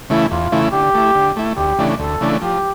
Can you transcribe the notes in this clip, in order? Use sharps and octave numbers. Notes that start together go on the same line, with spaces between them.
C#3 E3 A3 E4
E2 F4
C#3 E3 A3 E4
D3 G4
A3 E4
D3
A3 E4
D2 G4
C#3 E3 A3 D4
D2 A4
C#3 E3 A3 D4
F3 G4